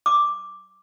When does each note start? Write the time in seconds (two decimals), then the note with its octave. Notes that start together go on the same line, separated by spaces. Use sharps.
0.06 D6